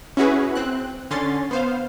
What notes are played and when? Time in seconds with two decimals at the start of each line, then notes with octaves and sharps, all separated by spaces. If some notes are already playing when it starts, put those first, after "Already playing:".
0.17 C#4 E4 F#4 G#4 B4
0.55 C4 F#6
1.11 D3 C#4 C6 A6
1.51 B3 C5 F5